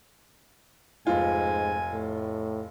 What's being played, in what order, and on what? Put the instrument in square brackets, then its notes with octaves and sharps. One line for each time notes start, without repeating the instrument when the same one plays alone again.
[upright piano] F1 F4 [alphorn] G#2 [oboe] G#5
[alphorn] A2